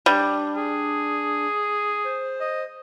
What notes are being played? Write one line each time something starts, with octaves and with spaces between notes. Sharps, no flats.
G3 D4
G#4
C5
D#5